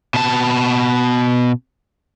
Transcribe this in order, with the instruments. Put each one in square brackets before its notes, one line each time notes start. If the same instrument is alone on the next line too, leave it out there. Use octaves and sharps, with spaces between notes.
[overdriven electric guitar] B2 A5